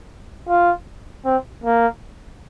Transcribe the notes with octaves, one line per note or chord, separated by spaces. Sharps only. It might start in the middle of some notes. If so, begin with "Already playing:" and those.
F4
C4
A#3